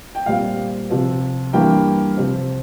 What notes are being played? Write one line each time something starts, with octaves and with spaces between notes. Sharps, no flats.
G5
A#2 G3 C4 F5
C3 F3 C4
G2 E3 A#3 G5
C3 F3 C4